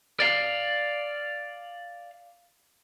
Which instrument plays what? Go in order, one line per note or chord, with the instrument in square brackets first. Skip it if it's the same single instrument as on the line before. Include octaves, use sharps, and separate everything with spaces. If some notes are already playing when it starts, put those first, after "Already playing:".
[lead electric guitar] D5 F5